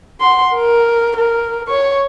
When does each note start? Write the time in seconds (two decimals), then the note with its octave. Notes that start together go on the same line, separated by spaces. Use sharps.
0.20 F#5 C6
0.55 A#4
1.16 A#4
1.67 C#5 C#6